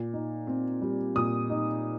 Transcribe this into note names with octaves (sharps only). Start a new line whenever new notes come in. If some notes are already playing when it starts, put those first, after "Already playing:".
Already playing: A#2
D#4
C4
G3
A#2 D#6
D#4